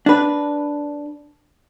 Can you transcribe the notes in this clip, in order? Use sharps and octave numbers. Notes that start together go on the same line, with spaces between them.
D4 B4